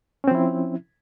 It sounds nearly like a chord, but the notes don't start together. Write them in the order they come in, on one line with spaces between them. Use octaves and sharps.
C#4 C4 F3 E4